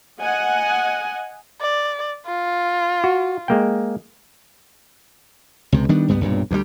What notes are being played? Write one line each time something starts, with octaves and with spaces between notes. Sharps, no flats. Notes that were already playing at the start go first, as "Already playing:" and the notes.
D#5 F#5 G#5
D5
F4
F#4
G#3 A#3 G5
C#2 C3
D#3 G3 B3 D4
C#2 G2 G3 B3
B1 G2 A#2
D2 D3 G3